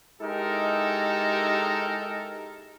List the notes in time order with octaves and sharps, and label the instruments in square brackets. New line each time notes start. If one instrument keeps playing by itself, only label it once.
[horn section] G#3 D#4 E4 G4 A4 A#4